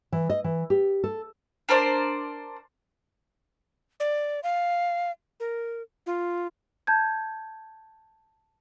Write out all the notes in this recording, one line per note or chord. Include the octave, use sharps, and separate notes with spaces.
E3
D#5
E3
G4
A4
D4 A#4 C5 D5
D5
F5
A#4
F4
A5 G6 G#6